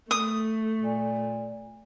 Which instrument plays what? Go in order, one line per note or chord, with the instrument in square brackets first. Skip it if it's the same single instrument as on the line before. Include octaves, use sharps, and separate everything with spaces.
[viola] A3 [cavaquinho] D#6
[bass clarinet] A#2